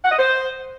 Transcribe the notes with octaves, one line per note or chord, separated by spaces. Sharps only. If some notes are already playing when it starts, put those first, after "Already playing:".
F#5
D#5
C5